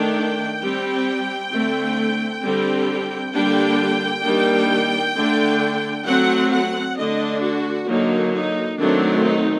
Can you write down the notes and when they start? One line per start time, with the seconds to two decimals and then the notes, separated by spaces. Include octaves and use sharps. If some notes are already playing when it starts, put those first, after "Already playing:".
Already playing: D#3 A3 D4 G5
0.62 G3 C4
1.52 D3 A3 C4
2.43 D3 G3 C4
3.34 D3 G3 A#3 D4 G5
4.24 D#3 G3 A#3 D4
5.16 D3 A3 D4
6.06 F#3 A3 C4 F#5
6.52 F#5
6.97 D3 A3 D4 D#5
7.42 F#4
7.87 D3 F#3 A#3 D#4
8.33 D#4
8.78 D#3 F#3 A3 C4 D4
9.23 D#4